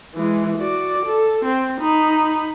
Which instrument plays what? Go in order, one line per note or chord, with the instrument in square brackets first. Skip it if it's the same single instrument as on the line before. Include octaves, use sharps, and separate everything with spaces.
[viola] E3 G#3
F#4 D5
A4
C4
D#4 B5